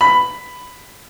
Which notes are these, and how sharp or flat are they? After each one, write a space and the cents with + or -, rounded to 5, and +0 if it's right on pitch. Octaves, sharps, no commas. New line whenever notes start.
B5 +10